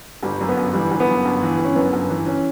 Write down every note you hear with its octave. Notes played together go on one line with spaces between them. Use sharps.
G1 G3
F#2
B3
G1
E3 G3
G1
B3
F#2
G1
E3
G1
C#4
F#2 B3
G1
E3
C#4